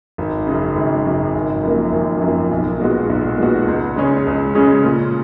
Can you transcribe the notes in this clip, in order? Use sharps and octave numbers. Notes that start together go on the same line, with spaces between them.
G#1
F#2 C#3
G#1
F#2 C#3
G#1
F#2 F3 A#3
G#1
F#2 F3 A#3
B1
A#2 G#3 B3 F#4
B1
A#2 G#3 B3 F#4
C#2
C#3 G#3 C#4
C#2
C#3 G#3 C#4
A#2